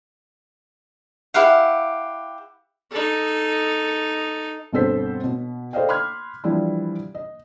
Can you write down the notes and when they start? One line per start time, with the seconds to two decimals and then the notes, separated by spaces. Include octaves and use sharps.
1.34 E4 G4 F5 F#5
2.91 D#4 A4
4.73 G1 B2 C4 A4 C5 B6
5.24 B2
5.73 A4 C5 D5 D#5 F5 G5
5.89 B5 C6 D6 F6 F#6 G#6
6.44 E3 F3 G3 D4 E4
7.15 D#5